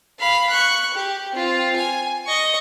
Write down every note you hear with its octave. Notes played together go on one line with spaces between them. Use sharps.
F5 B5
C#6 F#6
G4
C4 F4
G#5
D#5 C#6